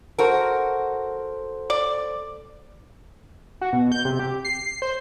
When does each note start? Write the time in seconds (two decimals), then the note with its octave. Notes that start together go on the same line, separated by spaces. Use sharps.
0.19 F#4 A4 A#4 C5
1.70 D5
3.61 F#4
3.73 B2
3.92 G6
4.05 C3
4.20 G4
4.45 C7
4.82 C5